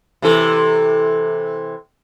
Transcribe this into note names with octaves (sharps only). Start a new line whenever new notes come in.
C3 E3 A4